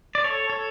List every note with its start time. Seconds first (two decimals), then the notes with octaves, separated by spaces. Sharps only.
0.15 D5
0.24 A4 C#5
0.50 A4 C#5